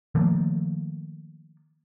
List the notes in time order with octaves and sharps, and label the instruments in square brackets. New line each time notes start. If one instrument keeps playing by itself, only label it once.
[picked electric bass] D#3 F3 A3 A#3